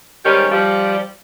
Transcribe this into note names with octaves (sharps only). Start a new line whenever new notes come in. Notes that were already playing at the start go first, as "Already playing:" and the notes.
G#2 D#3 G3 C#4 G4
F3 G3